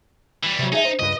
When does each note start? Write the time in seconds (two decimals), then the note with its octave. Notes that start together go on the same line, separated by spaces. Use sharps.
0.44 E3 G3
0.59 C3 F#3
0.73 D#4 G#4 E5
0.85 C5
0.99 C#2 G2 B4 D#5